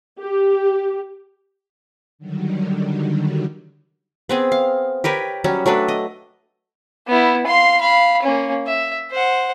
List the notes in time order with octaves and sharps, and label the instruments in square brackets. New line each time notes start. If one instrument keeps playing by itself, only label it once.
[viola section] G4
[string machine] D3 D#3 F#3 G3
[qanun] B3 C4 G#4
F5
G4 A#4 B4 C#5
F#3 G3 C#4
F#3 A3 D4 B4
D#5
[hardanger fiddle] B3 E4
F5 C6
F5 B5
A#3 C#4
E5
C5 F#5